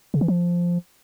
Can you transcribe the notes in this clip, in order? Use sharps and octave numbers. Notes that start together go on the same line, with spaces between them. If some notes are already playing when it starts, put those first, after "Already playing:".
C#3
E3
F3